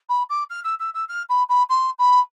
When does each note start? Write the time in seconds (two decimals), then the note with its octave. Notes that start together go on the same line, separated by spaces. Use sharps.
0.09 B5
0.30 D6
0.50 F6
0.64 E6
0.79 E6
0.94 E6
1.09 F6
1.29 B5
1.49 B5
1.69 C6
1.99 B5